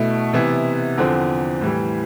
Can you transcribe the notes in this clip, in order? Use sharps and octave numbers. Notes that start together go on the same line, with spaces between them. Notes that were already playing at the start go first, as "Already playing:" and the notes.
Already playing: B2 A3 E4
C3 E3 B3 E4
E2 D3 F3 C4
A2 E3 G3